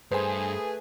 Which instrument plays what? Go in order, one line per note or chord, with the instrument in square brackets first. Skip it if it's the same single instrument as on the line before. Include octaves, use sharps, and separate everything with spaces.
[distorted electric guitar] G2 [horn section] A3 G#4 [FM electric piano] B4 G#5 [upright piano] C5